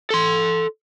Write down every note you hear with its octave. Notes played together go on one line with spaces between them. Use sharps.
A4 C6